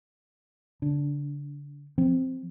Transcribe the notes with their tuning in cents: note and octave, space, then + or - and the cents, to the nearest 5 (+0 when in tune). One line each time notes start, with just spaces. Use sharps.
D3 -35 D4 -10
F3 +0 C4 +0